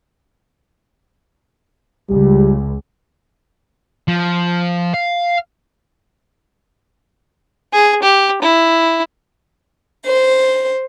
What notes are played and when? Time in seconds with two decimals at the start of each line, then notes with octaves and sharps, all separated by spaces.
2.09 C#2 G3
4.08 F3
4.94 F5
7.73 G#4
8.02 G4
8.42 E4
10.06 C5